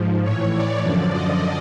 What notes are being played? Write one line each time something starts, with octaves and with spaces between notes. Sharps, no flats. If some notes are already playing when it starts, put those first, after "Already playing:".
Already playing: G#2 F3
A2 E3 C#5
D5
F#2 D3 F3
D#5